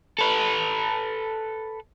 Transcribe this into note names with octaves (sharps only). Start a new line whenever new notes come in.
A4 B4